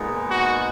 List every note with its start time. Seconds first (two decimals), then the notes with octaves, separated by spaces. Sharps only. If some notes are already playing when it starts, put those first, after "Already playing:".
Already playing: A#2 G#3 B3 D#4
0.26 F#4